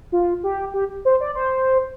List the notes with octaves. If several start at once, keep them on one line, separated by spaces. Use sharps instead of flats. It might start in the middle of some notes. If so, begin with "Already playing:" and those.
F4
G4
G4
C5
D5
C5